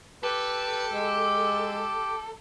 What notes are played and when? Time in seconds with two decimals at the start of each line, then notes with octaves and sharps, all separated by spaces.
0.23 G4 A4 B4 D6
0.93 G#3